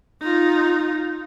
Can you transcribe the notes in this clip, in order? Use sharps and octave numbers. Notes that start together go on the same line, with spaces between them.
D#4 F4